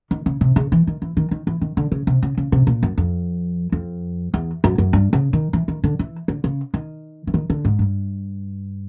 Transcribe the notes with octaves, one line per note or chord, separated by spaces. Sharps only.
D#3
C#3
C3
C#3
E3
D#3
E3
D#3
D#3
E3
D#3
D3
C#3
C3
C#3
C#3
C3
A#2
F#2
F2
F2
E2
F#2
F#2
G2
C#3
D#3
E3
D#3
D3
E3
D3
C#3
D#3
E3
D#3
D3
G#2
G2